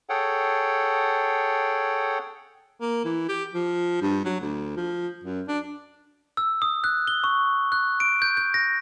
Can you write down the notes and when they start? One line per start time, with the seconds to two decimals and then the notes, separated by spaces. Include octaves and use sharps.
0.09 G#4 A4 C#5 F#5 G5
2.81 A#3
3.04 E3
3.28 G4
3.54 F3
4.02 G2
4.25 F#3
4.41 D2
4.77 F3
5.24 F#2
5.48 D4
6.37 E6
6.62 D#6
6.84 F#6
7.07 G7
7.24 C#6
7.72 F#6
8.00 D7
8.22 G6
8.37 G6
8.54 A#6